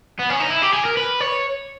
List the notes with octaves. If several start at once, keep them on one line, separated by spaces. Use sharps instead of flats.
B3
C#4
D#4
E4
G4
G#4
A#4
B4
C#5